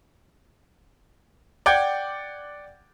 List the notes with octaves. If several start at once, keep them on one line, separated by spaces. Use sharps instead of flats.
D5 F#5 G5 D6 G6 G#6